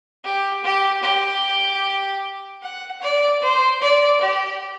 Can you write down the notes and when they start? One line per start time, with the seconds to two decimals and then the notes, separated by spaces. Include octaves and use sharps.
0.24 G4
0.64 G4
1.02 G4
2.62 F#5
3.01 D5
3.41 C5
3.81 D5
4.20 G4